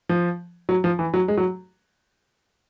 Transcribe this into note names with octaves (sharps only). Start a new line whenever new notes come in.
F3
F#3
F3
E3
F#3
G#3
F#3